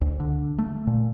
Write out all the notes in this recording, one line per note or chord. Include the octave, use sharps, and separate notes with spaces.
D2
D3
A3
A#2